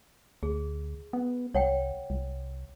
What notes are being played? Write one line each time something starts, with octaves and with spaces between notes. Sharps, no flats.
D2 G#4
B3
C2 C#5 F#5 G5
C2